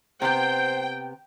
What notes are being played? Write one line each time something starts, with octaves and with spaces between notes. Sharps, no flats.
C3 B3 C5 G5